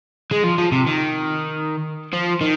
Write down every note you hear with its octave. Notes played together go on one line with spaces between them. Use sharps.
G#3
F3
F3
C3
D#3
F3
D#3